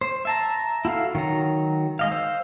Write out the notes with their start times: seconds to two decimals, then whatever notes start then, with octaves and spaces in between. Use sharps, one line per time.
0.01 C5
0.25 E5 A5 A#5
0.85 E4 F#4 A4 F5
1.15 D#3 F#3 A#5
1.99 G#3 D#5 F5
2.11 C5 F5 E6